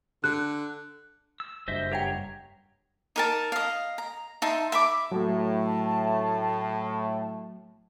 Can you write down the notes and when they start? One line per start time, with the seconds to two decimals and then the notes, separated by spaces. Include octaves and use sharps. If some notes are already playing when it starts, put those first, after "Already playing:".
0.24 D3 F#6
1.40 E6
1.68 F#1 G2 C5 D#5 E5
1.92 G4 B4 C#5 F#5 G5 A#5
3.16 D#4 A#4 A5
3.52 D#5 F5
3.98 A#5
4.42 D#4 E5 A5 C6
4.72 E5 B5 D6
5.12 A2 F#3 A3 A5